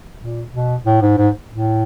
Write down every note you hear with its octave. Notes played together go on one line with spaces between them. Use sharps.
A#2
B2
A2
G#2
G#2
A2